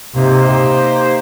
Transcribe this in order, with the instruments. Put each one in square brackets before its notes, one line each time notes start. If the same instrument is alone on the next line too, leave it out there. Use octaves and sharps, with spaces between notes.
[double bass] C3 [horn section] A#3 D#4 G4 C5